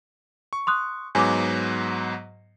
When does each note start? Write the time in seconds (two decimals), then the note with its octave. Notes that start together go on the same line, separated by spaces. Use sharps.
0.53 C#6
0.67 C6 D#6 F#6
1.15 G#2 F#3 B3 G#5 D6